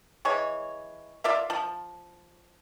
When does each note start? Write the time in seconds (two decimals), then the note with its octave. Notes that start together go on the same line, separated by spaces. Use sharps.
0.25 E3 G#3 C#5
1.24 F4 D5 E5 F5
1.50 F3